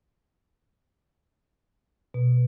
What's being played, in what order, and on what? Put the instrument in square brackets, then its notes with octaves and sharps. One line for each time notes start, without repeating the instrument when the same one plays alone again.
[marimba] B2